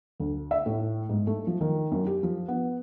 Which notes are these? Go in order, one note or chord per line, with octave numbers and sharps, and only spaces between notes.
D2
E5
A2
G#2
A3
F3
D#3
F#2
G4
F3
B3